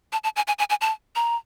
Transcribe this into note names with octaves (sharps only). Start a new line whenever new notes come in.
A5
A5
G#5
G#5
G#5
G#5
A5
A#5